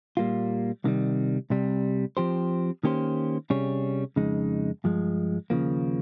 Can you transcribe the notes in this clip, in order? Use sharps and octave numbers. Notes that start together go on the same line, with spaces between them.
A#2 G3 A#3 F4
C2 C3 D#3 G3
C2 C3 G3
F3 C4 G4 C5
D#3 A#3 C#4 G4 C5
C3 G3 C#4 G#4 C#5
F2 C#3 G#3 D#4
G2 F3 G#3
D#2 C#3 F3 A#3